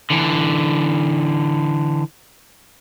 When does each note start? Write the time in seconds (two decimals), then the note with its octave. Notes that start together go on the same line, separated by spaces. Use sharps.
0.10 D3 E3